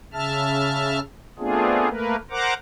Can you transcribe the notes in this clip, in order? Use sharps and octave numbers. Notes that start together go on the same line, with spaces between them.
C#3 E5 A5 F6
A3 B3 C4 D4 F4 G#4
A3 A#3 A#4 B4
A#4 C5 F#5 A#5 D6